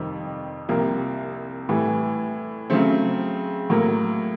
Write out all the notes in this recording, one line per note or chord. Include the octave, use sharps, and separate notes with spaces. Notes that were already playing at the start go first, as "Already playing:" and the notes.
Already playing: F2 C3 D#3 G3 C4
C2 C3 F3 A#3
A2 E3 G3
C#3 F#3 A3 C4
A2 F#3 A#3